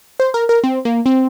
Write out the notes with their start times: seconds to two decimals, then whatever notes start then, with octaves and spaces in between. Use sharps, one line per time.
0.20 C5
0.34 A#4
0.49 A#4
0.64 C4
0.85 A#3
1.06 C4